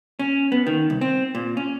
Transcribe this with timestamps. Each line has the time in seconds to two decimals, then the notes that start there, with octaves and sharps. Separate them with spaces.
0.19 C#4
0.52 B3
0.67 D#3
0.90 C2
1.01 C4
1.35 A#2
1.57 C#4